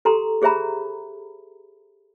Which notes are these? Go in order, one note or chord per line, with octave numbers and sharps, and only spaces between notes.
G4 A4 A#5 C6
G4 G#4 C5 E5 A#5 B5